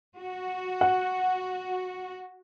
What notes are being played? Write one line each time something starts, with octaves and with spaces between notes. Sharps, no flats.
F#4
F#5